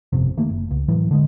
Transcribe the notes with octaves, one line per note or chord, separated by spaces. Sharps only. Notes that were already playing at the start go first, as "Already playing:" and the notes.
G1 F2 C3
C3 D#3 A3 A#3
F#1
C#2
A2 E3 F#3
D3 G#3